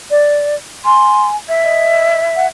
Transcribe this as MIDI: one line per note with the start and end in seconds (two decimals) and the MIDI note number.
0.11 0.55 74
0.85 1.36 80
0.85 1.27 84
1.49 2.47 76
1.64 2.19 75
2.36 2.47 78